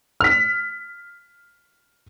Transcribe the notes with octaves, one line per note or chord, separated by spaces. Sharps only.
F6 B6